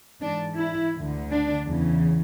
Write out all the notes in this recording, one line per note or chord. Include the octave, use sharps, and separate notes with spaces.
G#2 E3 D4
E4
D2 D3
D4
E2 C#3 E3